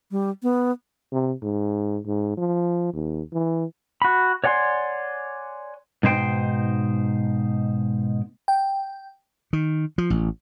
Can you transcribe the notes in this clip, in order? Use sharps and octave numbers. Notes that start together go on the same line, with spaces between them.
G3
B3
C3
G#2
G#2
F3
D#2
E3
F#4 B5
C#5 D5 F#5 G#5 C6
G#2 B2 D#4 C5 G5
G5
D#3
F3
A1